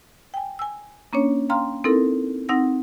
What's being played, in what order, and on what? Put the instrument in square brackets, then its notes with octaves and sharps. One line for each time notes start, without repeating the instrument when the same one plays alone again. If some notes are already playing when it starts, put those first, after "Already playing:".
[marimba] G5 G#5
G#5 E6
A#3 C#4 D4 C#5
F5 G5 A#5 C6 F6
C4 D#4 E4 A4 A#4
C4 D#4 F#5 E6 A#6